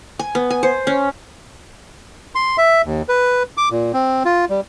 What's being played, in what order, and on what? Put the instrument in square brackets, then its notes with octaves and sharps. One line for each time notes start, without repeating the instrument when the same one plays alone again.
[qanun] G#5
B3
G#5
C5
C#4
[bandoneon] C6
E5
D#2
B4
D6
A#2
C4
F4
G3